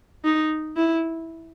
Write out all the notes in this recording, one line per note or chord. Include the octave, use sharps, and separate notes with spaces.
D#4
E4